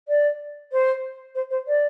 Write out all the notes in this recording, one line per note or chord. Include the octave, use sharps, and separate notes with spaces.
D5
C5
C5
C5
D5